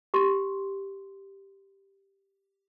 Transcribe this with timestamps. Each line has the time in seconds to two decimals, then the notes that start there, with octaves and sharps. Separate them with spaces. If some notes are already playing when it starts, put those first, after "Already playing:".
0.14 G4 C6